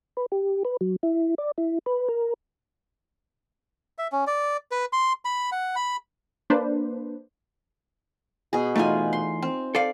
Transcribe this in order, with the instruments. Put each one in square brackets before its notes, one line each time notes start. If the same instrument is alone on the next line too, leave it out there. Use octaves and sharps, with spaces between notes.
[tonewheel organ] B4
G4
B4
F#3
E4
D5
E4
B4
A#4
[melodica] E5
C#4
D5
B4
C6
B5
F#5
B5
[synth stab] A#3 D4 B4 C5
[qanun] B2 G#4
[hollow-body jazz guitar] E2 A3 [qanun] D#4 F4 G#5
[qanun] C6
C4
[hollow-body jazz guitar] A4 D5 F5